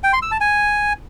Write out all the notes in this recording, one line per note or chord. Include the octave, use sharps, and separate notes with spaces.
G5
C6
E6
A5
G#5